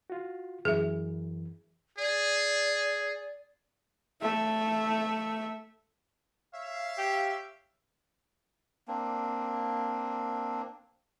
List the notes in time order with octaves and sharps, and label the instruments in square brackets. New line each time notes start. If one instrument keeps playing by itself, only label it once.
[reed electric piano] F4 F#4
[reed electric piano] F#2 E3 [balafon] G#4 E5
[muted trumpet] G#4 [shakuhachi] D5
[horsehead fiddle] A3 E5
[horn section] C#5 E5 F5
[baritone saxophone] G4
[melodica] A#3 C4 D4